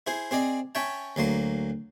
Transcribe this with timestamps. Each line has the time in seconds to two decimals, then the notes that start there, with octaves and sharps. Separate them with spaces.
0.07 E4 G#4 C5
0.31 C4 G#4 D5 D#5
0.75 C#4 C#5 E5 G5 A5
1.16 D2 F#3 A#3 C6